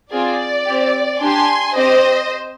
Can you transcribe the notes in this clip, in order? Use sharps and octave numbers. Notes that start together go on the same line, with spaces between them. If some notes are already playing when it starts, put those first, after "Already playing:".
C4 F4 G#4 D5
C4 G4
D4 G4 G#5 C6
C4 G4 C5 D#5